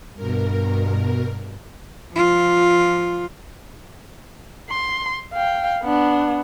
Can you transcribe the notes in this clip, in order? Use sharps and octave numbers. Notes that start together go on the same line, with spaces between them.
G2 B2 A#4
F3 F4
C6
F5 G5
B3 D4